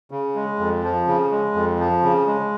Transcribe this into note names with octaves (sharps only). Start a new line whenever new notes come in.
C#3
G#3
F2
F3
C#3
G#3
F2
F3
C#3
G#3